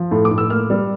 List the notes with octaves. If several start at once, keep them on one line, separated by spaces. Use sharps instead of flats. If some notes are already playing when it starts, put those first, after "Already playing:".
Already playing: F3
A2
D6
A2
E6
A#3 F6
G3